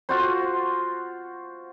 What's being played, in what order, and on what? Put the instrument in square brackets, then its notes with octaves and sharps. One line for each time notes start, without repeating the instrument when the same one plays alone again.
[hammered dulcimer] F4 F#4 C5